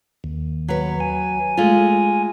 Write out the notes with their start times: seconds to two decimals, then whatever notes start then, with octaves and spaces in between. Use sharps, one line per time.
0.24 D#2
0.68 F#3 B4
1.00 G#5
1.57 G#3 A3 F4